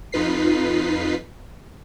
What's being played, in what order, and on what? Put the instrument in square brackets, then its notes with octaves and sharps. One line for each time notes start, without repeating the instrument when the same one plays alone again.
[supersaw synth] F2 D#4 F4 B4 B6 C7